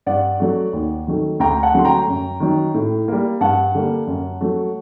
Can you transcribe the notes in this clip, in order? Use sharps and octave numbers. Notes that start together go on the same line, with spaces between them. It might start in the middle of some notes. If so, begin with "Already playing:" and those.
G2 D5 F#5
F#3 A3
D#2
D#3 F#3 A3
D2 G5 A#5
F#5 A5
D3 F#3 A3 C6
G5 A#5
F#2
D#3 F#3
A2
G3 A#3
G2 F#5 A5
D3 G3 A#3
F#2
F#3 A3